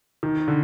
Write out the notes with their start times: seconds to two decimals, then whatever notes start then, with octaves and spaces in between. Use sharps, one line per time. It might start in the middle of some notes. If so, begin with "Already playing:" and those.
0.23 D#3
0.48 D3